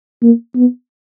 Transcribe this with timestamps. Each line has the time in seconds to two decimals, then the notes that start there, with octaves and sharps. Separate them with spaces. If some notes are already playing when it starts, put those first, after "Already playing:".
0.22 A#3
0.56 B3